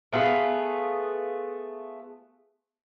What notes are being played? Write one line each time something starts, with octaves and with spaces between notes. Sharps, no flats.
A3 B3 F4 G#4